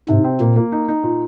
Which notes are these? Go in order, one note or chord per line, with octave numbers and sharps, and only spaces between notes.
G#2 C3
C4
A#2 A#3
A#3
D#4
D#4
A#2